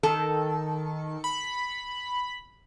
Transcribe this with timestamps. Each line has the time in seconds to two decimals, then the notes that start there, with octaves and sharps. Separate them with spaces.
0.03 D#3 A4
1.24 B5